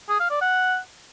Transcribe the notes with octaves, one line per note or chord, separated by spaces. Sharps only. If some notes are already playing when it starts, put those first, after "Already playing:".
G#4
F5
D5
F#5